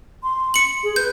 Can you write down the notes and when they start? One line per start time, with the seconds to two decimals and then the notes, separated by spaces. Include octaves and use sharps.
0.23 C6
0.54 C#7 F#7
0.83 G#4
0.96 B4 G6